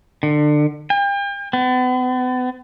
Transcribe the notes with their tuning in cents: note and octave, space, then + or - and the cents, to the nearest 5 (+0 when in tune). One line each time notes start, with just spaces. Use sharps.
D3 +25
G5 +40
B3 +40